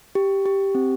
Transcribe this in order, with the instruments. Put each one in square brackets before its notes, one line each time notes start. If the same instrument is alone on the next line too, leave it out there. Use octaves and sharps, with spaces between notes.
[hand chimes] G4
G4
C4